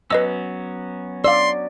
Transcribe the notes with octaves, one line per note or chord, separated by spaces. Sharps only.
F#3 B3 C#4 B4 D#5 E6
D5 F5 C6 E6